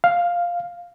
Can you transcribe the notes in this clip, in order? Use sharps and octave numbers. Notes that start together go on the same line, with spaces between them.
F5